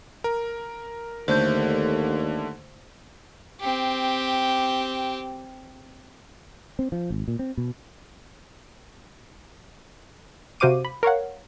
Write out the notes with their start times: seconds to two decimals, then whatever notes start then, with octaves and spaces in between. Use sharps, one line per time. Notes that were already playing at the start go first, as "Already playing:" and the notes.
0.24 A#4
1.28 D#2 D3 A3 C5 G6
3.60 C4 G4
6.79 C4
6.92 F3
7.10 G#1
7.28 A#2
7.39 C4
7.57 B2
10.60 C3 F#4 C5 F5 D6 D#7
10.85 B5
11.03 A#4 C#5 F5 F#5